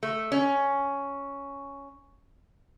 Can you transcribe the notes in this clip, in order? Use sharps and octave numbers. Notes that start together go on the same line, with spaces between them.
A3
C#4